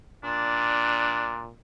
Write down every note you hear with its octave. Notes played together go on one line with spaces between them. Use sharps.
A#2 D4